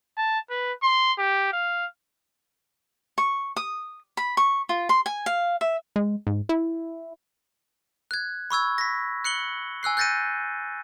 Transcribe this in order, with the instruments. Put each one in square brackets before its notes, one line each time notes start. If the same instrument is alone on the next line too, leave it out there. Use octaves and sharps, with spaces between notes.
[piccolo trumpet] A5
B4
C6
G4
F5
[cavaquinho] C#6
D#6
B5
C#6
F4
C6
G#5
F5
E5
[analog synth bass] G#3
G#2
E4
[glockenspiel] F#6 G#6
B5 C#6 E6 G#6
A#6 B6
F#6 C#7 F#7 G7
G#5 E6 F#6 C7
F#6 G6 A6 A#6 C#7 D#7